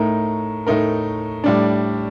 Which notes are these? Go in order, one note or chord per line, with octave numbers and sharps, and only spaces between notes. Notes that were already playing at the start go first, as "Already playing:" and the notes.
Already playing: A2 A3 D#4 A#4
A2 A3 D#4 A#4
A2 G3 D4